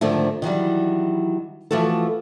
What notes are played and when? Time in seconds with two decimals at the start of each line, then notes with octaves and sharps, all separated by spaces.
0.01 G#2 D3 D#3 F3 A3
0.42 D#3 E3 F#3 G3
1.71 E3 F3 A3 F#4 A4